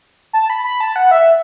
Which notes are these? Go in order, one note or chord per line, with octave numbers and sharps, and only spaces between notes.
A5
B5
B5
A5
F#5
E5